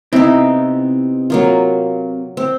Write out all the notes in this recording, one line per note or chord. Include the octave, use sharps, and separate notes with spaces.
C3 B3 C4 D#4 E4
F#3 A#3 F4
C4